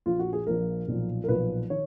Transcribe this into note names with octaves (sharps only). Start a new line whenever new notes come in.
A#1 A#2 F3 F4
F#4
G#4
A#1 A#2 F3 A#4
B1 A#2 F3
A#4
B1 A#2 F3 B4
D#3 C#5